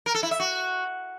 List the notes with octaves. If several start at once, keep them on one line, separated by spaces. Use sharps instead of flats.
A#4
A4
E4
E5
F#4